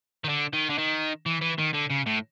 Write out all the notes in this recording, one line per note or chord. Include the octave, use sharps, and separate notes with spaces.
D#3
D3
D#3
D3
D#3
E3
E3
D#3
D3
C#3
A2